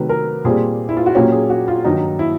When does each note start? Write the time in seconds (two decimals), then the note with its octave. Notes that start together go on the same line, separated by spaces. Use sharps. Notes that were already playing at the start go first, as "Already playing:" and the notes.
Already playing: C3 D#3 F#3 A3 B4
0.09 A#4
0.45 A#2 G3 C4 G#4
0.89 E4
0.97 F4
1.06 F#4
1.15 A#2 F#3 A#3 C#4 G4
1.32 G#4
1.50 F#4
1.68 F4
1.84 G2 D#3 F#3 D#4
2.19 E4